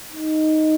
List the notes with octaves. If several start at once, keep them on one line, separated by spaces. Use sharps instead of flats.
D#4